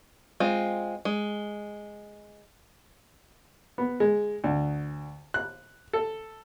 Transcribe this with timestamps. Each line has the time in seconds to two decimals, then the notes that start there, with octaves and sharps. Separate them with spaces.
0.40 G#3 C4 F4
1.05 G#3
3.78 B3
4.00 G#3
4.44 D2
5.34 F#6
5.93 A4